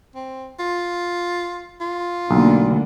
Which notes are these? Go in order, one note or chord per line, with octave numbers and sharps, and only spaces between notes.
C4
F4
F4
B1 D3 A3 A#3